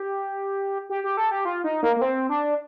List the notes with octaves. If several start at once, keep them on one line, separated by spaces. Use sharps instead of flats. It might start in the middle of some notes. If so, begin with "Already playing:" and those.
Already playing: G4
G4
G4
A4
G4
F4
D#4
A#3
A#3
C4
D4